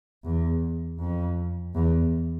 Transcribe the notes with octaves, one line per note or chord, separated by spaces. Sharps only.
E2
F2
E2